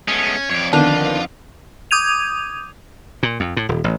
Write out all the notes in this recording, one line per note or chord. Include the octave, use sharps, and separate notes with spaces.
G#3 A3 B3 C#4
F2 C#5 D5
D3 D#3 B3 D4 F4
D6 D#6 G6 G#6 D#7 F7
A#2
F2
A2
D#1
A1